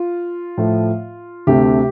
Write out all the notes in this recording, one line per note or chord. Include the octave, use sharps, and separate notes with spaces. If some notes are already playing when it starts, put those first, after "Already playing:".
Already playing: F4
A2 F3 A3
D2 C3 A3 G4